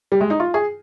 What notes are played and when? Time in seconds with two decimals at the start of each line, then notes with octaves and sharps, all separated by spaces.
0.12 G3
0.21 G#3
0.30 D#4
0.40 F4
0.54 G#4